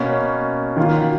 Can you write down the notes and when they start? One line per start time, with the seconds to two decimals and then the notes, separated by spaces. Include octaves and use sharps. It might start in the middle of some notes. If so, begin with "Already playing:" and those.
Already playing: B2 A#3 C#4
0.77 D#3 A#3 F4 F#4